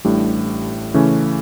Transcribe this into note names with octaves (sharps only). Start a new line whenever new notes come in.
A1 A2 G3 D4 G4
C#3 E3 A3 C#4